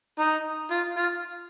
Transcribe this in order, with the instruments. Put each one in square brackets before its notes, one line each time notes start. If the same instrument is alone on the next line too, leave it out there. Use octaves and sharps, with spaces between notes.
[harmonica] D#4
F4
F4